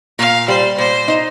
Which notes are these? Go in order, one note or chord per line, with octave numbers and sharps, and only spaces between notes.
A#2 F5
G3 C5
A#2 C5
D#4